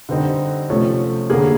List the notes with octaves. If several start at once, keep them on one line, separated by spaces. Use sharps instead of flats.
D3 G3 C4 D#4
C3 F3 A3 C#4
D3 G3 A#3 G#4